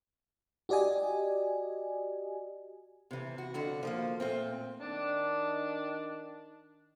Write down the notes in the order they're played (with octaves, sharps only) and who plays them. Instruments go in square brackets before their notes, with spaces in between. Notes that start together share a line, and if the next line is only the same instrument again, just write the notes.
[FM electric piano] F#4 G4 D5 D#5 G#5
[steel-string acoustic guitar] C3 E3
F#4
F2 D3 F#4
F3 A3 A#3
A#2 A3 C4
[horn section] D#3 D4